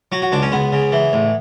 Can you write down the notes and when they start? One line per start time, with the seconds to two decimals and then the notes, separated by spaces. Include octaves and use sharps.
0.12 F#3 F#4
0.22 F#4
0.32 C#2 D4
0.42 C#4
0.52 C#2 B3
0.73 C#3
0.92 E3
1.13 A1